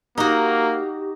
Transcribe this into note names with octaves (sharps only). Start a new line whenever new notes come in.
A#3 D#4 F#4 G4